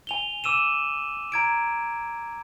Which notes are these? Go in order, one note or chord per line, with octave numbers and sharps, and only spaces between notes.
G#5 F7 G7
D6 E6 D#7 E7
A#5 G#6 D7